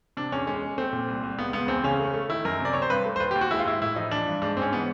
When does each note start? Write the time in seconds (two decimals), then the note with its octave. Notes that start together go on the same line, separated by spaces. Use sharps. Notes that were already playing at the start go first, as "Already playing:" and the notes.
0.17 C3 D4
0.32 E2 C#4
0.47 G#3 C#4
0.62 G#3
0.78 A3 C4
0.93 A#2
1.08 C2
1.23 C2
1.38 C#2 B3
1.53 C#2 B3
1.68 E2 C4
1.84 C#3 C#4
2.00 A3
2.14 A3
2.29 D#3 E4
2.45 F#2 A#4
2.60 C3 D5
2.73 C3 C#5
2.82 C5
2.90 G2 B4
3.06 A3
3.16 C5
3.20 D#2 B4
3.31 G4
3.35 D#2
3.41 F#4
3.51 G#3 E4
3.59 F4
3.65 G#2 E4
3.81 A2 E4
3.96 F3 D#4
4.11 E3 D4
4.26 G2
4.42 G#2 D4
4.57 G#2 C4 C#4
4.72 E3 B3